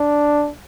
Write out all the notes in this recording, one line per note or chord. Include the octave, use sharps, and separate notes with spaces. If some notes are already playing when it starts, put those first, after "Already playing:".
Already playing: D4